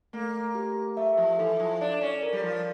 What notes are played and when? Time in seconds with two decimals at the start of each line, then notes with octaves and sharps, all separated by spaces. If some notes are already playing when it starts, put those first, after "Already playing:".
0.13 A3 A#3
0.55 G4
0.97 A3 E5
1.17 F3
1.39 E3 A4
1.59 F3
1.81 D4 D5
2.01 C#4
2.23 A#4
2.33 G3
2.43 F3